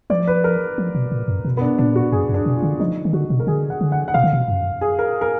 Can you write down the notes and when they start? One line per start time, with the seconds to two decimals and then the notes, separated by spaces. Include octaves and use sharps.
0.10 F3 D5
0.27 B4
0.44 A#4
0.78 F3
0.95 B2
1.12 A#2
1.28 F#2
1.45 B2
1.57 B3
1.61 D4
1.78 A#2 D4
1.95 F#4
2.12 F#2 G#4
2.29 F#2 D4
2.46 B2
2.57 F4
2.62 D3
2.79 F3 D#4
3.05 D#3
3.13 D3 F#4
3.30 B2
3.40 A#4
3.47 D3 G#4
3.70 F#5
3.81 D3
3.92 F#5
4.08 F#5
4.14 B2 F5
4.24 D3
4.33 B2
4.48 F#2
4.81 G#4
4.99 A#4
5.21 A#4